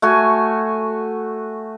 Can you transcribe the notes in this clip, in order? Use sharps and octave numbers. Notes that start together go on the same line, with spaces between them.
A3 F#4 G#5